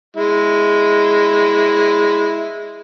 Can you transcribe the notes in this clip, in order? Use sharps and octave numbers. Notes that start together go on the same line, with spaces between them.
G#3 E4